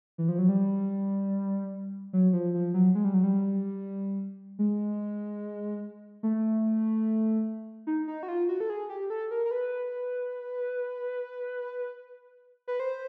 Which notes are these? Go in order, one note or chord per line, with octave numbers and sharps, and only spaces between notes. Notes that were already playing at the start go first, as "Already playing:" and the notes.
E3
F3
F#3
G3
F#3
F3
F3
F#3
G#3
G3
F#3
G3
G#3
A3
D#4
D#4
F#4
F4
F#4
A4
G#4
G4
A4
A#4
A#4
B4
B4
C5